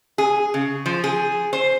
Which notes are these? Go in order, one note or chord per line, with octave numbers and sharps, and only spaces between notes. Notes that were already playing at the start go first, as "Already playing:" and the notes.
G#4
C#3
F3
G#4
C5